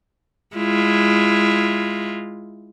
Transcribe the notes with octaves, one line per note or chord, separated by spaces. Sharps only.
G#3 E4 F4